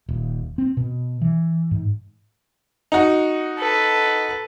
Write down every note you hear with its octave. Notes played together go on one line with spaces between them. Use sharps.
D#1
C4
B2
E3
G#2
D#4 F#4
A4 B4